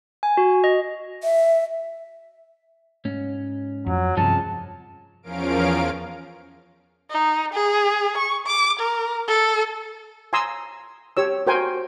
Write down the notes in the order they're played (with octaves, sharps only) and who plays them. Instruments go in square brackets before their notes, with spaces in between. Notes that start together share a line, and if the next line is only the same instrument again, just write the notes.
[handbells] G#5
F#4
D#5
[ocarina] E5
[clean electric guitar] G#2 C#4
[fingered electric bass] F2 [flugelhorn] F#3
[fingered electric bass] G2 C3 [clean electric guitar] F3 G#3 C#4 [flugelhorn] A5
[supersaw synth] E2 F3 C#4 A#4 F5 D7
[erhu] D#4
G#4
C#6
D6
A#4
A4
[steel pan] G#5 A#5 C6 D#6 E6
G4 C#5 E6
F#4 A#4 C5 G5 G#5